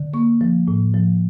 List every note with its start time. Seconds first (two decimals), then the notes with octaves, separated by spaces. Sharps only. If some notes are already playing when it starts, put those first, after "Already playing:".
Already playing: D3
0.14 A#3 C#6
0.41 F3
0.68 A2
0.94 F3